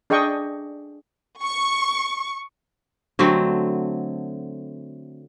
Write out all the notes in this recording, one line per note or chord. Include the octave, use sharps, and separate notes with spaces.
D4 G#4 D#5 G5 C#6
C#6
D3 F#3 A3 C4